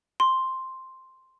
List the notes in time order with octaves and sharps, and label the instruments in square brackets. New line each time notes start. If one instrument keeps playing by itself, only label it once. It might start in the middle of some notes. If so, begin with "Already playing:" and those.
[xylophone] C6